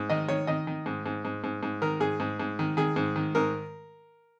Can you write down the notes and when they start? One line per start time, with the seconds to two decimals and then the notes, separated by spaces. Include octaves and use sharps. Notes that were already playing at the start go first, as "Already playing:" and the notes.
Already playing: G#2
0.10 D#3 D#5
0.28 D#3 C#5
0.47 D#3 D#5
0.67 D#3
0.86 G#2
1.06 G#2
1.25 G#2
1.44 G#2
1.63 G#2
1.82 D#3 A#4
2.00 G#2 G#4
2.20 G#2
2.40 G#2
2.59 D#3
2.77 D#3 G#4
2.96 G#2
3.16 D#3
3.35 G#2 A#4